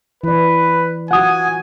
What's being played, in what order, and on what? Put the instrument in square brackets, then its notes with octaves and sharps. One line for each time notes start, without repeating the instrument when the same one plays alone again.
[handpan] E3 D5 [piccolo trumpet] B4
[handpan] F4 F#4 [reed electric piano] F#5 D#6 [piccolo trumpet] G#5